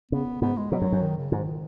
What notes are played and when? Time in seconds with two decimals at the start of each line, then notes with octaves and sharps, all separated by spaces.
0.11 C#3 B3
0.41 G#2 B3
0.57 G#3
0.72 B2 F#3
0.82 F#2
0.92 F#2
1.01 D#3
1.17 C#3
1.32 G#2 D#3